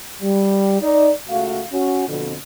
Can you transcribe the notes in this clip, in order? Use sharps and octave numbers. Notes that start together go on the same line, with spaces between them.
G3
D#4 D5
C#2 A3 F#4 F5
C#4 F#4
F2 B2 D3